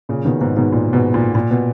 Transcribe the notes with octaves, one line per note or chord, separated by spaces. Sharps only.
A#2 C#3
B2 D#3
G#2 B2
G#2 B2
A#2
G#2 B2
A#2
A#2
B2